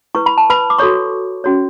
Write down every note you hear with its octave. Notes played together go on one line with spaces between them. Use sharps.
E4 B4 C#6
B5
A5
B4 B5
D6
F#4 A4 C#5 C#6
C#4 F#4 C#5